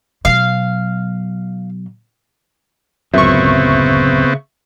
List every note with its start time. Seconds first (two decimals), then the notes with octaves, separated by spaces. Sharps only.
0.25 B2 F#3 F5
3.14 D1 C#2 F#2 C#3 B3 C4 E5 C#6